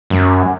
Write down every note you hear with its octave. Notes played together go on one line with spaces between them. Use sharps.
F#2